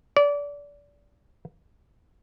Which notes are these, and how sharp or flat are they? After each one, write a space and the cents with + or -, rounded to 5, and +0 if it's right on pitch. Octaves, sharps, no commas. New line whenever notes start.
D5 -25